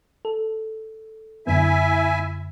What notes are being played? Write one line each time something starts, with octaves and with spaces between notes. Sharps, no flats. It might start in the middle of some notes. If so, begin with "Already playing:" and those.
A4
F#2 D3 B3 E4 E5 G#5